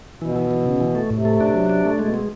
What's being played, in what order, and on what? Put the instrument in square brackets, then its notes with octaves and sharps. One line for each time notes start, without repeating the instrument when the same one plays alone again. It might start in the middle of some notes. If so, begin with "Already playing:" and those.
[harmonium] B2 [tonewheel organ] E3
[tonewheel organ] E3
E3
C#3
E3
A3
[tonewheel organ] A2 [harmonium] C3
[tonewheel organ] A3
D4
F#3
D4
A3
[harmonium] B2 [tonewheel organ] G#3
[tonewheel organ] G#3